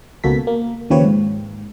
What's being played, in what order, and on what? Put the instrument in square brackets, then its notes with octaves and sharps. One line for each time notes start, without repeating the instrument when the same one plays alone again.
[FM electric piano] C#2 B2 A#3 F#4 A4 B6
A#3
D#2 C#3 F3 G4 B4 C#5
G#2